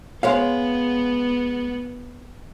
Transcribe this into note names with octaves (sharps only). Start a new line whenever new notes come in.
G#3 B3 C#5 F5